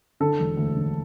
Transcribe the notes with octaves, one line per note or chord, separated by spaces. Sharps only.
D3 A4
E1
D2
D3